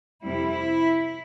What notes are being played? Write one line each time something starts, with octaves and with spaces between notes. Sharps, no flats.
F2 C3 G3 E4